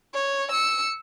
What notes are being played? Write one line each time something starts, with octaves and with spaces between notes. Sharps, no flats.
C#5
E6 C#7